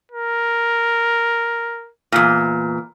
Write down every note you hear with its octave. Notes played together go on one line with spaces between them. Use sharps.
A#4
E2 A#2